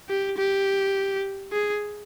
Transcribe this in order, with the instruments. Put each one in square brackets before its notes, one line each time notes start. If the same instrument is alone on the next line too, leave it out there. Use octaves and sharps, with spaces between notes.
[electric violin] G4
G4
G#4